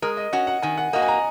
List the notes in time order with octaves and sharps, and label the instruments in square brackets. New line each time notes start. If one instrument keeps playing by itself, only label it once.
[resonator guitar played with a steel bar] G#3 [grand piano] A#4
[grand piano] D#5
[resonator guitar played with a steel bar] C#4 F#4 [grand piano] F#5
[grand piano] F#5
[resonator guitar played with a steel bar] D#3 [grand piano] G#5
[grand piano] F#5
[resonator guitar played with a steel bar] A#3 F#4 [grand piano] D#5
[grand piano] G#5
A#5